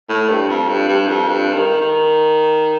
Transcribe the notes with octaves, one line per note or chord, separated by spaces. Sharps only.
A2
G2
F2
G2
G2
F2
G2
D#3
D#3